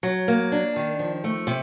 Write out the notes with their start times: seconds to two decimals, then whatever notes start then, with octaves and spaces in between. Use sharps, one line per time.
0.03 F#3
0.28 A#3
0.52 D4
0.76 D#3
0.99 F3
1.24 A3
1.47 C3